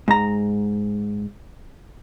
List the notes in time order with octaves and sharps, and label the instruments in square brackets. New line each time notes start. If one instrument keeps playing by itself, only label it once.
[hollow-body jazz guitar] G#2 A#5